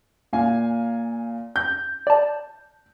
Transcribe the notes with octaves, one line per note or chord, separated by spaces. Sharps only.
A#2 F5 G#5
G6
D5 A5